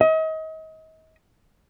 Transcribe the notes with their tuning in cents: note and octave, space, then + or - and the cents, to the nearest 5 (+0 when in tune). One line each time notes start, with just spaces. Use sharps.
D#5 +35